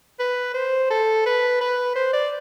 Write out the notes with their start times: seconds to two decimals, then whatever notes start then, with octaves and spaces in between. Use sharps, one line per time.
0.19 B4
0.54 C5
0.90 A4
1.26 B4
1.61 B4
1.95 C5
2.13 D5